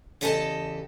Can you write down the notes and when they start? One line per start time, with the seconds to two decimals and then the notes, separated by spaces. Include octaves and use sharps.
0.21 E2 C#3 G4 A4 D#5 A5